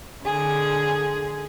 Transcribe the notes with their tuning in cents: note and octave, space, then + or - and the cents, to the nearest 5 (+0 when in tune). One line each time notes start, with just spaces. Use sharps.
D3 +15 G#4 +0